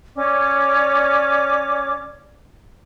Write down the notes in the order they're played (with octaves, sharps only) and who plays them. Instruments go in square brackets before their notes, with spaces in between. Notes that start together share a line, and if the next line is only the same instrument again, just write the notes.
[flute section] C#4 C#5 D5 D6